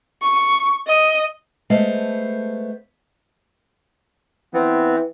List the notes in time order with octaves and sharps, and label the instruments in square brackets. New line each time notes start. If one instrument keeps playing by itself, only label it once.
[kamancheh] C#6
D#5
[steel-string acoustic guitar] G#3 A3 B3 C5 F5
[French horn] E3 [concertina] B3 C4